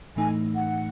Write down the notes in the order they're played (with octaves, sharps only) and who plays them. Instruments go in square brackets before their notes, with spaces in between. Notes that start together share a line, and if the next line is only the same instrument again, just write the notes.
[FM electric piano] A2 E3 A3 D#4 [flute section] G#5
[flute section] F#5